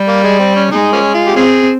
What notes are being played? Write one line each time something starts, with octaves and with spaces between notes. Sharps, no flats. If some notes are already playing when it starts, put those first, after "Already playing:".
Already playing: G3
A#3
G#3
C4
C#4
G#3 D#4
F3 A#3 C#4
F4
G4
C4 C#4 F4 G#4